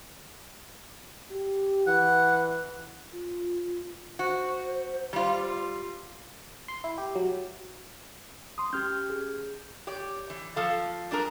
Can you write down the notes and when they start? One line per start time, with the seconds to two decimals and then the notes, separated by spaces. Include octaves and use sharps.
1.31 G4
1.87 E3 F#5
3.12 F4
4.19 F#4 C5
5.13 G3 F4
6.68 C6
6.84 E4
6.98 G4
7.15 F#3
8.58 C6 D#6
8.73 C#4 G4 F6 G6 G#6
9.10 G#4
9.87 G4 C#5 D5
10.30 E3
10.56 F3 A4 F5 A5
11.11 G3 D4 G#4 A#4